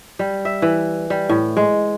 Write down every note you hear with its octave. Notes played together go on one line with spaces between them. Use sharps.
G3
E5
E3
G3
A2
G#3